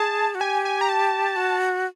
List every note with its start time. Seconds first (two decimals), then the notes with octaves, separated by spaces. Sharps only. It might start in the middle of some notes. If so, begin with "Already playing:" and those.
Already playing: G#4 A5
0.35 F#4
0.40 G4 G#5
0.65 G#5
0.81 A#5
0.89 A5
1.36 F#4